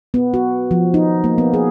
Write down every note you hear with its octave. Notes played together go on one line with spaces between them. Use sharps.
B3
F#4
F3
D#4
A#3
B3
G#4